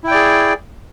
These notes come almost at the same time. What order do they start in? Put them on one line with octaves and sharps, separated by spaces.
E4 G5 D5 G#4